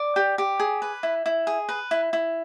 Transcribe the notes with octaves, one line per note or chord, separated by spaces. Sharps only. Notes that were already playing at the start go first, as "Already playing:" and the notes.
Already playing: D5
G4
G4
G#4
B4
E4
E4
G#4
B4
E4
E4